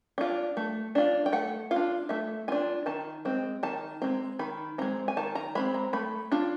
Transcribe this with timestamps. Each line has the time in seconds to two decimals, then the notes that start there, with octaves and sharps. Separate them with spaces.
0.18 D4 F4
0.57 A3
0.95 D4 F4
1.26 G5
1.33 A3 F#5
1.71 F4 F5
1.76 D4
2.09 A3 E5
2.48 D4 F4 G#5
2.86 D#3 A5
3.25 G#3 C4
3.63 D#3 A5
4.02 G#3 C4 A#5
4.39 D#3 B5
4.78 G#3 C4 A#5
5.08 G#5
5.17 D#3 A5
5.35 A#5
5.55 G#3 C4 B5
5.74 A#5
5.93 A3 B5
6.32 D4 F4